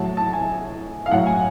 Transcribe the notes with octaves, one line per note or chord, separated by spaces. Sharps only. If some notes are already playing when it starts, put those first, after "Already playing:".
Already playing: A2 F#3 A5
A5
G#5
F5
A2 F#3 F#5
G#5